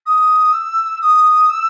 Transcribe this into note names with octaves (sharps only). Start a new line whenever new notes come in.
D#6
E6
D#6
E6